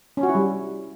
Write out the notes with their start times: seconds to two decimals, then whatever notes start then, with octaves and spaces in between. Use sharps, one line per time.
0.17 C#4
0.23 F#4
0.29 E4
0.35 G3